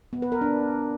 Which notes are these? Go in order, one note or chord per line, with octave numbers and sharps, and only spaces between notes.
B3
B4
A#4
D4